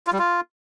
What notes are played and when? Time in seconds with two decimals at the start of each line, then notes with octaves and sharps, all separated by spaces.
0.07 F4
0.13 G3
0.19 F4